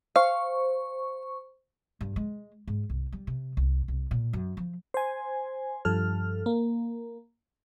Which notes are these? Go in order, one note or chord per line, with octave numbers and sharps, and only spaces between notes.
C5 F5 C#6
G2
G#3
G#2
C2
G3
C3
C2
C2
A#2
F#2
F3
C5 G#5
G2 F3 A4 F6
A#3